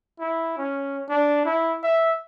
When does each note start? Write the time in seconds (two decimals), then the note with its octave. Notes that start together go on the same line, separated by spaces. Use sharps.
0.20 E4
0.58 C#4
1.09 D4
1.45 E4
1.83 E5